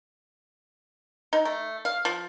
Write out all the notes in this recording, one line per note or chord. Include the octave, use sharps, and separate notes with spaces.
D#4
A3
F5
F3